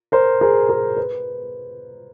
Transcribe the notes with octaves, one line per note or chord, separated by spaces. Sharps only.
A#4 C5
G#4 A#4
G#4 A#4
B4